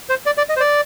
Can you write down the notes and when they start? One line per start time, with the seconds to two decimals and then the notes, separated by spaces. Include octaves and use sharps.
0.09 C5
0.26 D5
0.38 D5
0.49 D#5
0.57 C5
0.60 D5